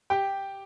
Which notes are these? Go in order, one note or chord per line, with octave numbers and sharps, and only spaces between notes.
G4 G5